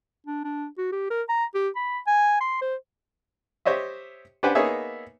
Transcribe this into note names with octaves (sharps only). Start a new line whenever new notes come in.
D4
D4
F#4
G4
A#4
A#5
G4
B5
G#5
C6
C5
G4 C5 C#5 D#5 E5
D4 G4 B4 C5 F#5 G#5
A#3 B3 D#4 G#4 C#5 E5